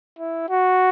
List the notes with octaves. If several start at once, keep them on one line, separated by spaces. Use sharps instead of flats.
E4
F#4